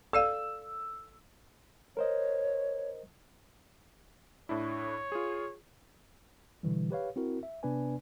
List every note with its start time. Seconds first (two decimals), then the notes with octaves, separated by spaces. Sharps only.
0.13 A4 D5 F5 E6
1.97 A#4 C5 C#5 D#5
4.49 A2 D4 E4 C#5
5.12 F4 G#4
6.63 B2 D3 E3 G3
6.91 G4 B4 C#5 F5
7.16 C4 E4 F#4 A#4
7.43 E5
7.63 C3 B3 D4 B4 D5 G#5